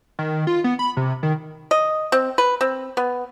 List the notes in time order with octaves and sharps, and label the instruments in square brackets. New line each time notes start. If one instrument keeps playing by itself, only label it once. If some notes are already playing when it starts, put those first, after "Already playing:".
[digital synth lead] D#3
F4
B3
B5
C3
D#3
[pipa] D#5
C4
B4
C4
B3